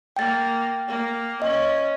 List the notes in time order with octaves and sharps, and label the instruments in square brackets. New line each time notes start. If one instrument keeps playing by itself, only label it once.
[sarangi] A#3 [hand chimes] G5 A6
[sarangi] A#3
[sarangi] C#4 [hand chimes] D#5